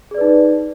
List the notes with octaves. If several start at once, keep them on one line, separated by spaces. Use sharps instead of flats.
D#4 G#4 B4 D5